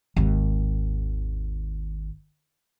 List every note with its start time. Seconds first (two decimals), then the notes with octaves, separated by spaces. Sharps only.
0.16 G#1 D#2